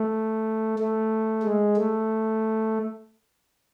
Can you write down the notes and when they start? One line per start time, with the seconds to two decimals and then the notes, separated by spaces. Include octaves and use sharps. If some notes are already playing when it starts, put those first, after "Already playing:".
Already playing: A3
0.79 A3
1.43 G#3
1.77 A3